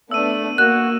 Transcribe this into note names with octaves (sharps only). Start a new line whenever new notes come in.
A3 B3 D4 E6 D#7
A#3 F#4 F#6 E7